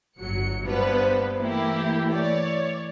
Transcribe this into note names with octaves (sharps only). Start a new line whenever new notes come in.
G1 F#3 C#7
G2 B3 B4 C5
E3 A3 A#3 E4 G4
C#5 D5